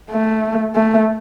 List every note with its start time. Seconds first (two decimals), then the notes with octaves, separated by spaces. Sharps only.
0.11 A3
0.75 A3